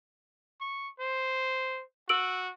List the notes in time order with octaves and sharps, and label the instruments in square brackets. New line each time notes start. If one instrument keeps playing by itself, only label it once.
[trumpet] C#6
C5
[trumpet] F#4 [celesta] E6 D7 F#7